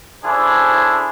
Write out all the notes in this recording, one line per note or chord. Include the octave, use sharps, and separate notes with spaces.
C#4 D4 E4 G#4 A4 C5